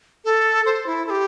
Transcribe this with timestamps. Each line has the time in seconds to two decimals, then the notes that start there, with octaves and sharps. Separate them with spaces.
0.25 A4
0.66 C5
0.86 E4
1.07 A4
1.10 G4